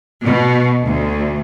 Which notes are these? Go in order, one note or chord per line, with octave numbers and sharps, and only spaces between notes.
B2
D2